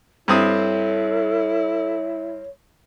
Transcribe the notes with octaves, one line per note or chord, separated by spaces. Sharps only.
G2 C4 E4 A4 C#5 D#6